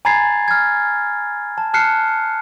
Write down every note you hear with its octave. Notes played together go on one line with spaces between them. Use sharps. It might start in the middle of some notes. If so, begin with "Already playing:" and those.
G#5 A#5 B5 G#6 A6 C7
F6 G#6
A5
A5 F6 F#6 C7 C#7